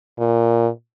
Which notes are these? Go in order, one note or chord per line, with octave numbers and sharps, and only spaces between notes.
A#2